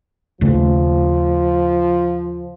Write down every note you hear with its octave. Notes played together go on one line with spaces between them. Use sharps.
D#2 C#3 F3 A3